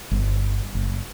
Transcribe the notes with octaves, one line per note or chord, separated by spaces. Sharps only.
G1
F#1